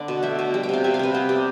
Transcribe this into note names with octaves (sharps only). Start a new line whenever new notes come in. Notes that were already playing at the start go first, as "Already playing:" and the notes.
Already playing: D3 B3 D5
B2
A3 E5
B2
G3
G5
C3 F5
C3 E5
F5
C3 B4
B3 C5
C3 D5